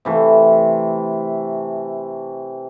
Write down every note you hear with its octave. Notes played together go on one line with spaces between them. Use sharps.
C3 E3 A3